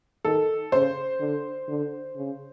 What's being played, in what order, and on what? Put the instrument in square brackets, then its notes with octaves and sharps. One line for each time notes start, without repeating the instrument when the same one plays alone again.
[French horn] D#3 [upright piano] A4
[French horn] C#3 [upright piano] C5
[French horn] D3
D3
C#3